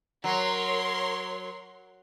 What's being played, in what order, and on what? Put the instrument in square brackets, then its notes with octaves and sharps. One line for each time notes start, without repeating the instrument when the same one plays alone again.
[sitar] F#3 [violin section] A#4 C#5 C6